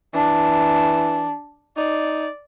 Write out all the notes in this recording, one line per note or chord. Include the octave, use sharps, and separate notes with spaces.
E3 D4
D#4 D5